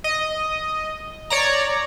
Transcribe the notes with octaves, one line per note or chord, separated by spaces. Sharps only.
D#5
C#5 D5 A#5